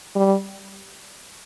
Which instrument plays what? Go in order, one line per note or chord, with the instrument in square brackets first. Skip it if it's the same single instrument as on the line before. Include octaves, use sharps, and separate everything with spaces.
[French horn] G3